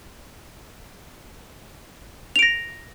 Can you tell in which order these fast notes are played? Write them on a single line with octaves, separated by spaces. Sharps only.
F7 D7 A#6